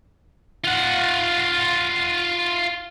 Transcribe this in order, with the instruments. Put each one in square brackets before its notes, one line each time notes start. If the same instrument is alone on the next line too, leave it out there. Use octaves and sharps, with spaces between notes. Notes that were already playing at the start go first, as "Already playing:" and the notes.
[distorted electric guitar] F4 F#5